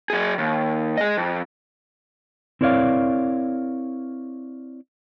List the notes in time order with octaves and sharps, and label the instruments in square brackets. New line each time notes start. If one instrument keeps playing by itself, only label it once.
[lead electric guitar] F#3 G#4
D#2
G#4 D#5
F2
[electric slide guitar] C4 E4 A#4 C#5 D5 F5